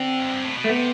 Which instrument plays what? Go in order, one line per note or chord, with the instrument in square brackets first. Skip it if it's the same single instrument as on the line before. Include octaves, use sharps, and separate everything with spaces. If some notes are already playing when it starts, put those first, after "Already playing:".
Already playing: [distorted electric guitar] D3 [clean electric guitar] C4
[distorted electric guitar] F2
G2
A2
B2
[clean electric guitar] A3
[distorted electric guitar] C3 [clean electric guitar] B3